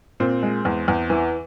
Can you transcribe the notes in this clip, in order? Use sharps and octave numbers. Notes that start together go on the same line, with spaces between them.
A#2 C4
G#3
E2
E2
E3